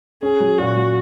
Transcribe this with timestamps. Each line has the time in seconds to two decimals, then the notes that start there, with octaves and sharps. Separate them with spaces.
0.23 C#4 G#4
0.40 F#3
0.58 A#2 F#4
0.77 F#3